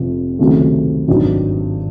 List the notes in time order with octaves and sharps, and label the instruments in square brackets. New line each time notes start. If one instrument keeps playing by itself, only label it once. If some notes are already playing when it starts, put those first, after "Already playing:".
Already playing: [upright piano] F1 F2 C3 F3
C#2 C3 D#3 F#3 A3
G#1 G2 D#3 F#3